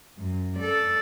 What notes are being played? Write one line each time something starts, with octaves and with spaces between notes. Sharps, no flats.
F#2
A4 D5